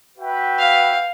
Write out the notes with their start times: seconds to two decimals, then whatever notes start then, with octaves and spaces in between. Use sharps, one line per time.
0.17 F#4 B4 E5 G5
0.59 F5